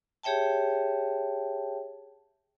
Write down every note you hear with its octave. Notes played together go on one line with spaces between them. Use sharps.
G4 G#4 C#5 E5 G5 A5